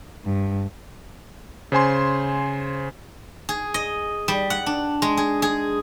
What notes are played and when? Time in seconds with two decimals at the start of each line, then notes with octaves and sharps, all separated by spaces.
0.23 G2
1.72 C#3 C5 G#5 C6
3.49 G#4
3.74 D#5
4.28 G3
4.50 F#5
4.66 D4
5.02 G#3
5.17 G#4
5.42 G#4